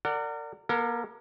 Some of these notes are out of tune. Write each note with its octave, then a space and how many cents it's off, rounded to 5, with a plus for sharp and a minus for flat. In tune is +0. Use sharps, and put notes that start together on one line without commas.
A#4 -35 D5 +0 F#5 +0
A#3 +35 A#4 -35